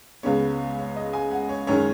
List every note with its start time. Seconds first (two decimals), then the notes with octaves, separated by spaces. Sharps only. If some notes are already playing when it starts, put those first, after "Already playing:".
0.23 C#2 C#3 G#3 B3 C#5
0.78 C#5
0.96 D#5
1.13 G#5
1.31 F#5
1.49 C#5
1.67 F#2 D#3 G#3 C#4 C#5